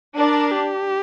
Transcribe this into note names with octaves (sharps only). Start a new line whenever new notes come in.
D4 A#4
G4